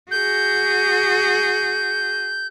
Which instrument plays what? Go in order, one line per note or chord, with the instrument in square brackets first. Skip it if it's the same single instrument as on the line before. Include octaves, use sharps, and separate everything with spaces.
[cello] F#4 G#4 [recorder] G6